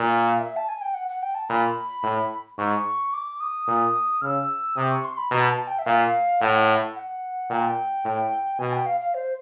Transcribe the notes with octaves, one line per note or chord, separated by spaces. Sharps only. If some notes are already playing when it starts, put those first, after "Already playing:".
Already playing: A#2 F5
E5
A5
G#5
G5
F#5
F#5
G5
A5
A#2 B5
A2
G#2 C#6
D6
D#6
A#2
C#3 E6 F6
C3 D#6
C#6
C6
B5
B2 A#5
A5
G5
E5
A#2 F5
A2 F#5
F#5
A#2 G5
A2
B2 G#5
G5
F5
F5
C5